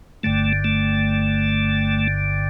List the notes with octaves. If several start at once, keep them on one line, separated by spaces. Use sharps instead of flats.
G1 G2 D3 A3
A3